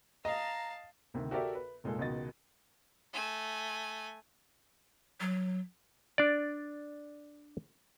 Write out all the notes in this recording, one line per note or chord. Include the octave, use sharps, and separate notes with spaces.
D#5 F5 A5 A#5
D2 C3 D#3
F#4 G4 A4 A#4 D5 E5
B4
F1 A#2 G#3 A4
C#2 B2 D#3 F#4 D#5 A6
A3 G#5
F#3
D4 D5